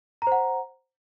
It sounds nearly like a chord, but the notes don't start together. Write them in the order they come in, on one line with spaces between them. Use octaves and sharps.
A#5 C5 F#5